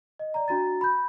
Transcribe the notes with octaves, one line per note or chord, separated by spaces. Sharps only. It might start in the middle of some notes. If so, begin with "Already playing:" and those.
D#5
D5 A#5
D4 F#4 A#5 A6
B5 G6